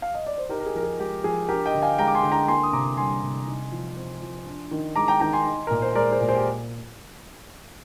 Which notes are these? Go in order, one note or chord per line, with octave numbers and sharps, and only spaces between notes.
F5
D#5
D5
C5
D#4 G4 A#4
A#4
G#4
F3 A#4
G#4
G#3 G4
F3 G#4
D4 G4 A#4
D#5 G5
D3
F5 G#5
G#3 G5 A#5
D6
G#5 C6
D3
G5 A#5
A#3 G#5 C6
D#6
C3 A#5 D6
G3 G#5 C6
C3
D#4
F3
C4
F3
D4
D#3
G#3 A#5 D6
G5 A#5
D#3 G5 A#5
G#5 C6
D#4
A#2 A#4
C5
G#3 A#4 D5
G#4 C5
A#2
G#4 C5
G4